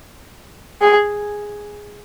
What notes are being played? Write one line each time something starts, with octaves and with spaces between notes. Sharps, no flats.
G#4